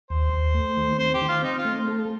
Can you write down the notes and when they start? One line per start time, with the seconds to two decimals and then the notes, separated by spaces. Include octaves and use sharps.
0.10 D#2 C5
0.33 D#2
0.54 A3
0.77 D#3
0.98 C4 C5
1.14 G4
1.21 D#3
1.28 F4
1.43 C4 D#4
1.58 F4
1.65 A3
1.88 A4